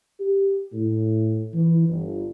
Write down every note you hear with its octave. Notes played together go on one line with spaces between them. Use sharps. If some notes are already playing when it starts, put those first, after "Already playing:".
G4
A2
E3
G1